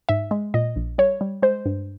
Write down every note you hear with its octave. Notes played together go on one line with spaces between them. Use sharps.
G#2 E5
G#3
A#2 D#5
A#1
G3 C#5
G3
G#3 C5
G2